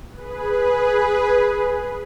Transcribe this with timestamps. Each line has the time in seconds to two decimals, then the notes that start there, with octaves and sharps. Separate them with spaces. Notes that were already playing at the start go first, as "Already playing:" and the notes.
0.11 G#4 B4